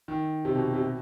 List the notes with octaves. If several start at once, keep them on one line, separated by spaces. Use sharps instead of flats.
D#3
C3
B2
C3
B2